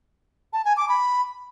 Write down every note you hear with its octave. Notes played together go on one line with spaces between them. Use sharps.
A5
G#5
D6
B5